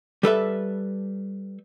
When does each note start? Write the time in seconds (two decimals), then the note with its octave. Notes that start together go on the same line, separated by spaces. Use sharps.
0.23 G3 A4 B4 E5